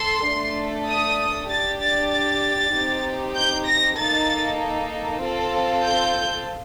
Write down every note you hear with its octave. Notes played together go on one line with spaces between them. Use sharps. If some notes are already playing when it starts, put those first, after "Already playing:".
Already playing: A4 C6
A3 D4 A4
D#6
D4 G4 A6
A6
A6
C4 D#4 G4
G6
A#6
A#3 D#4 A4 A6
C4 F4 A4
G6